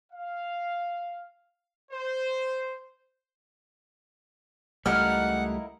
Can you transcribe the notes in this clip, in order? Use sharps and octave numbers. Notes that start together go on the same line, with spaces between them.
F5
C5
C#2 G3 A3 A#3 D#4 E4 F#5 F6